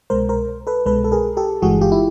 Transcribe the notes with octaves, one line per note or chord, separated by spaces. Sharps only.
C2 B2 G#3 A#4 C5
A#4 C5
A4 B4
C2 B2 G#3 A4 B4
A4
G#4 A#4
G4 A4
G1 G2 E3 G#3 F#4 G#4
F4 G4
E4